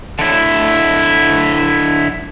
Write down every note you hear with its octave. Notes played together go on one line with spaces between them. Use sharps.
D3 E4